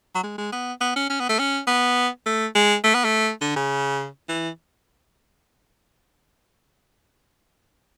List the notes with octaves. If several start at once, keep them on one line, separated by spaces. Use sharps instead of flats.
F#3
G#3
G#3
B3
B3
C#4
C#4
B3
A3
C#4
B3
A3
G#3
A3
B3
A3
D3
C#3
E3